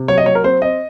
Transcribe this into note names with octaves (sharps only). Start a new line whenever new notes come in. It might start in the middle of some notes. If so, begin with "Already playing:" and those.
Already playing: C3
F#3 C#5
D#5
F#3 C#5
A#4
C4 C5
C4 D#5